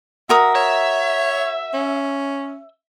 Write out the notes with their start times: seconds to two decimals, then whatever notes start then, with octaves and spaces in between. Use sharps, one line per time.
0.29 F#4 A#4 E5 D#6
0.55 C#5 E5
1.74 C#4